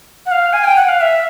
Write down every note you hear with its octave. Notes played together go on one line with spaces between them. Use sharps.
F#5
F5
G#5
G5
F#5
F5
E5